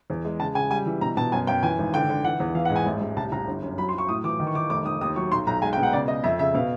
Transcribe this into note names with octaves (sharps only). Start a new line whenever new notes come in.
E2
G#3
C#3 A5
C#3 G#5
G3 G#5
E3
B2 A#5
B2 A5
F#2 G#5
F#2 G5
E3 G#5
G#1
D3 G5
D3
E3 F#5
E2
E3 F5
F#5
G#2
G#5
A1
A1
C2 A5
C2 A#5
G1
F#2
F#3 B5
C6
F#3 C#6
A2 D#6
E3 D6
D#3
C#6
D#3 D6
F1 D6
F1 D#6
D#2 D#6
F#3 C#6
B1 C6
B1 A#5
G#3 G#5
G5
B2
F#5
C#3 D5
G#3 D#5
F2 E5
C#3 E5
B2 F5